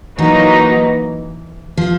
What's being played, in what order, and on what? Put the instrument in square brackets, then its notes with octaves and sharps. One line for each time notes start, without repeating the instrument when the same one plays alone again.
[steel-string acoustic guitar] E3 [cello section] F#3 A#3 D#4 F#4 B4
[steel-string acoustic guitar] F3